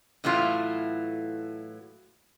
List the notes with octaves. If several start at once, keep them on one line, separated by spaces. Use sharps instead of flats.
A2 E3 F#3 A3 F4